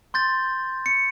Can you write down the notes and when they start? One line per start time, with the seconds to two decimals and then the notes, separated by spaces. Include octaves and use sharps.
0.14 C6 G6 A6
0.86 C#7